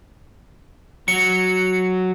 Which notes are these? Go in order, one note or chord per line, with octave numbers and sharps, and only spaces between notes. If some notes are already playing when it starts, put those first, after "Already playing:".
F#3 C#7